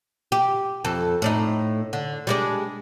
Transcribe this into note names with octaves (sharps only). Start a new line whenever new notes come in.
G4
F2 A4
A2 D4 D#4
D3
G3 G#3 D4